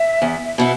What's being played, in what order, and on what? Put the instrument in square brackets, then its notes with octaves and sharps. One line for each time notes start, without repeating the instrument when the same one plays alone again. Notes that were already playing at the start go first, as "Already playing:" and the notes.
Already playing: [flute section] E5
[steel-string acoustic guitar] E2
B2 B3 E4